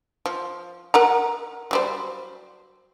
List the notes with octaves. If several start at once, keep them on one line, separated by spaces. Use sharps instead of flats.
F3
A#4 F#5 A#5
F#3 G3 C5